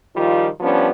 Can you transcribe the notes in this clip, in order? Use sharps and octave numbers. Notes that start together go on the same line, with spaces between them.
D#3 F3 G3 F4
F3 G3 B3 C#4 D4